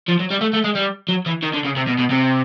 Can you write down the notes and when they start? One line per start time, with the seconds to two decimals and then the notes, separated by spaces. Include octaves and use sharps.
0.08 F3
0.19 F#3
0.30 G3
0.41 A3
0.53 A3
0.64 G#3
0.75 G3
1.09 F#3
1.26 E3
1.43 D#3
1.54 D3
1.65 C#3
1.76 C3
1.87 B2
1.99 B2
2.10 C3